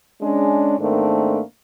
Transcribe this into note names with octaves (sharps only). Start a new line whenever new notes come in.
G#3 C#4 D4
G#2 D#3 A3 A#3 C4 D4